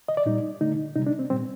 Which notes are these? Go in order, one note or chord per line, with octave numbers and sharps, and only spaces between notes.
D#5
D5
A#2 G3 D#4
D3 A3 D#4
C3 G3 D#4
D4
C4
A#2 G3 C4